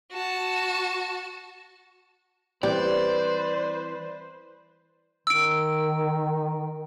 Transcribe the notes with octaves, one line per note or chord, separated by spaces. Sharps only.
F#4 A5
E3 G3 C4 B4 C5 D5
D#3 E6 D7